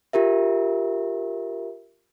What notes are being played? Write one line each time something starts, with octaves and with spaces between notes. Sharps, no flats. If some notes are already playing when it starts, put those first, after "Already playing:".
F4 G4 A#4 E5